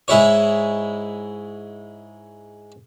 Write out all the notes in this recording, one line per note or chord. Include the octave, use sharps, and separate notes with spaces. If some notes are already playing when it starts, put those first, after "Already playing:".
G#2 G#3 E4 C#5